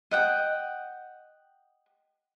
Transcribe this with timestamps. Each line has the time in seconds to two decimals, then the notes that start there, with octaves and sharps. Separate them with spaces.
0.11 D#5 F#5 G5